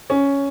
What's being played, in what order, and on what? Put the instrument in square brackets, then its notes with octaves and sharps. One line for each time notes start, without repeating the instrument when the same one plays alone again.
[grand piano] C#4